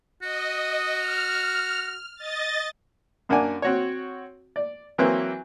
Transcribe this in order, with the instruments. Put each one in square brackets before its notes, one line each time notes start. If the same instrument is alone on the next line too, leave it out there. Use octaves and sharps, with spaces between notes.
[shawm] F#4 [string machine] D#5
[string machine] F6
D#5 A6
[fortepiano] F#2 A#3 D4 F#5 G#5
C4 F#4 C#5
D5
E3 F#3 A#3 C4 E4 B4